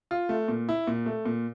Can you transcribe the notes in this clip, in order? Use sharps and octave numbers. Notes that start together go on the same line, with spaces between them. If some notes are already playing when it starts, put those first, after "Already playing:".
F4
A3
A#2
E4
A#2
A3
A#2